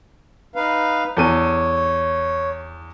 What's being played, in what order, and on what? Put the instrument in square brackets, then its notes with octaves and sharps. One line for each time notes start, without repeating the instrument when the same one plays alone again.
[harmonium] D#4 B4 F5
[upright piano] E2 A4 D#7 [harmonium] C#5